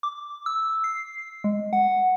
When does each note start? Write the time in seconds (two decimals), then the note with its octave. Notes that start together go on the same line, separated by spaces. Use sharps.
0.03 D6
0.46 E6
0.84 C7
1.44 G#3
1.73 F#5